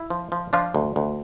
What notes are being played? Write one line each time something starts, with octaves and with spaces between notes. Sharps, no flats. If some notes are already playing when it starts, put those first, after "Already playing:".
Already playing: E4
F3
F3
F3 D4 F4
D2
D2